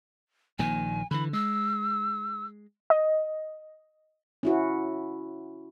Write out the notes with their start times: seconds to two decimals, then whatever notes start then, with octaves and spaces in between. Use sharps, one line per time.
0.59 A#1 A#2 D#3 G#5
1.11 D3 E3 B5
1.33 G#3 E6
2.90 D#5
4.43 C#4 E4 F#4